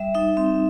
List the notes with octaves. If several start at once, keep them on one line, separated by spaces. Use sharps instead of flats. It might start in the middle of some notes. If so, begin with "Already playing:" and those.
Already playing: G3 E5
D#4 E5
C4 E5